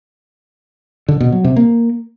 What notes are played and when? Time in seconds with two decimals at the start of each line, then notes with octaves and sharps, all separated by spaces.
1.08 D3
1.20 B2
1.32 F#3
1.44 C3
1.56 A#3